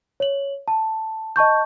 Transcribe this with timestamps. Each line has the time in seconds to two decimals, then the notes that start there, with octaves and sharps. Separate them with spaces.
0.20 C#5 F#7
0.68 A5
1.36 D#5 A5 C#6 G6